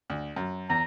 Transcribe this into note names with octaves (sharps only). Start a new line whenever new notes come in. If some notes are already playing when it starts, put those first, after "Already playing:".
D2
F#2
E2 A#5